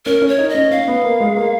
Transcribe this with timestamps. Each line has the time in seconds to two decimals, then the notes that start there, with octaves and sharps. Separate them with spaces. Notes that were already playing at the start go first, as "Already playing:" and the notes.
0.06 C#4 A#4
0.22 C#4
0.28 C#5
0.38 D#4
0.49 D#5
0.55 C#4
0.71 C#4 F5
0.88 B3
1.04 A#3
1.20 G#3
1.37 A#3